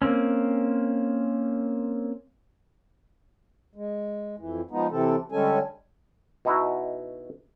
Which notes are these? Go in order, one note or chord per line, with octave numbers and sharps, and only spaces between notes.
A#3 C4 C#4
G#3
F2 E3
F3 G#3 B3 D#4
C3 E3 C4 A4
D3 G3 G#3 C#4 A4 G#5
B2 D#4 E4 F#4